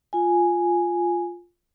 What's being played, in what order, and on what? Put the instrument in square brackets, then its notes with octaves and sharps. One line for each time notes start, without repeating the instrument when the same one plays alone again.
[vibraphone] F4 G#5